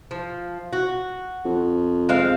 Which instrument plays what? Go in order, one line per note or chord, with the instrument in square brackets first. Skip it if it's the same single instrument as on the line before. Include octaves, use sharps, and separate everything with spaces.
[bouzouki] F3
F#4
[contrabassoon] F2
[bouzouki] G#3 C4 F5